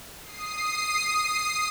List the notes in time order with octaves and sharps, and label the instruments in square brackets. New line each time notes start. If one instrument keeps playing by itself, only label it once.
[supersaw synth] D#6 C7